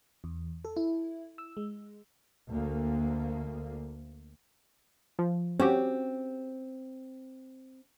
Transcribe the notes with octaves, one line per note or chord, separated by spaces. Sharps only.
E2
A4
E4
E6
G#3
D2 A#3
F3
C4 C#4 F#4 G4